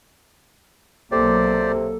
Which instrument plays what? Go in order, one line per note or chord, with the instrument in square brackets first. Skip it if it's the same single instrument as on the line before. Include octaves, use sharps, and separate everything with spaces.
[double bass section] B1 F#3 A#3 [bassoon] C3 [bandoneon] G4 C5 D5 [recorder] A4